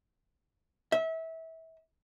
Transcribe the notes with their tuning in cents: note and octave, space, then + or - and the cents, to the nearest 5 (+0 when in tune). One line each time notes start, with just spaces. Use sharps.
E5 -25